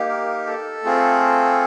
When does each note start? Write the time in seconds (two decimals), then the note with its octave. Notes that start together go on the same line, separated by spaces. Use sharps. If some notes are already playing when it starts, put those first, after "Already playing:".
Already playing: A#3 D#4 G4
0.09 A#4
0.47 A4
0.84 A3 C4 F4 G#4